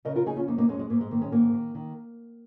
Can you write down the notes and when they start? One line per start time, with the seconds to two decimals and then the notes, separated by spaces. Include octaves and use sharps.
0.05 C#3 A#4 D#5
0.16 F4 A#4
0.26 C#3 D#4 G#4
0.36 C#4 F4
0.47 F2 A#3 D#4
0.58 A#3 D#4
0.68 F2 G#3 C#4
0.79 G#3
0.90 G#2 A#3
1.01 G#3
1.11 D#3 A#3
1.21 G#3 C#4
1.32 G#2 A#3
1.53 D#3
1.75 D#3